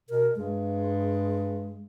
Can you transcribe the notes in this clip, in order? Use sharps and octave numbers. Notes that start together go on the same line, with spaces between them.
B2 A#4
G2 G#3